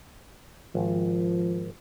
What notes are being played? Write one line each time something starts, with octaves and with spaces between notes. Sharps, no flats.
G#1 F3